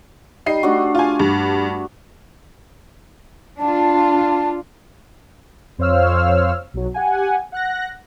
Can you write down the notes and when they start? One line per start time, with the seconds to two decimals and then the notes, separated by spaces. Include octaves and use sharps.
0.46 G3 D#4 C7
0.63 A3 D4 F#4
0.95 F4 G#5
1.20 G2
3.58 D4 F4 A5
5.79 F2 C5 C#5 F5 E6 F6
6.74 B1 F#3
6.94 G4 F#5 G#5
7.52 F#5 F#6 A#6